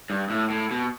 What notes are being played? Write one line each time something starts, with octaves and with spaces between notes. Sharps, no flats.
G2
A2
A2
B2